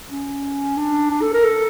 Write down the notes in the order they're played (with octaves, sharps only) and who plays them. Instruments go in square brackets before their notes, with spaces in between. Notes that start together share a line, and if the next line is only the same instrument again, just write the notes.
[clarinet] C#4
D4
D4
A4
A#4
A4